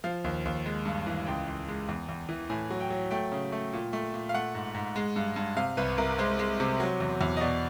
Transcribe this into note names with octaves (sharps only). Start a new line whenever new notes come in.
F3 F5
D#2
D#2
G#3
G2
E3
C#2 G5
C#2
G#3
E2
E2
E3
A2 G#5
F#3
G5
F#3
A3 G5
C#3
A3
A#2
A3
A#2
F5
A3 F#5
G#2
G#2
G#3
G2
G2
C3 F5
C2 B4
C2 A#4
G#3 C5
G#3
C3
F#3
E2
E2
D#5
B2 D5